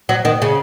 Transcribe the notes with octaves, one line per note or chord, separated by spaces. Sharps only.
F#3
D#3
C#3